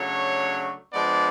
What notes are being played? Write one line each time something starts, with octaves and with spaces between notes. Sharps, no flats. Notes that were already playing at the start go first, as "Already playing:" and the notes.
Already playing: C#3 F#3 A3 D4 C#5
F3 G#3 B3 D4 D5